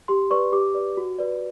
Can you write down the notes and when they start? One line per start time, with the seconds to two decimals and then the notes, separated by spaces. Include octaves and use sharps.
0.08 G4 C6
0.30 B4 D5 C#6
0.52 G4 D6
0.74 B4 D5
0.97 F#4
1.19 B4 D5